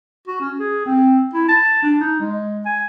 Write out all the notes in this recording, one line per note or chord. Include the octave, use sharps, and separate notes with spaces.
F#4
C#4
G#4
C4
E4
A5
D4
D#4
G#3
G#5